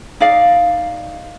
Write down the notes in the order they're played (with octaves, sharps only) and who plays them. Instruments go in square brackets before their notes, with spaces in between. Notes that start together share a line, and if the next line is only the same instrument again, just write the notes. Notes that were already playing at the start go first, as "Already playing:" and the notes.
[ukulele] D#4 D5 F5